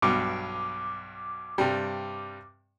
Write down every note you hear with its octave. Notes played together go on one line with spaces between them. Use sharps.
B1 G2 B2 D6
G2 C3 G3